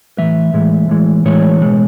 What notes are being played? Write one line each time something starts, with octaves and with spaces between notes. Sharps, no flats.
A2 E3 G#3 E5
A2 E3 G#3
A2 E3 G#3
A2 E3 G#3 C#5
B2 G#3